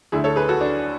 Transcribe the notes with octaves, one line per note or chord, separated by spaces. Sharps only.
D2 D3 E4 G#4
A4 C#5
G#4 B4
F#4 A4
D4